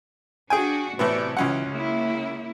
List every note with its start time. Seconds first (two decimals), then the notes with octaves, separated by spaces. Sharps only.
0.50 D4 F#4 G#4 G5 G#5
0.99 A2 C3 E3 B3 D5
1.37 C#2 E3 F#3 C#4 F#5
1.68 C#3 A#3 E4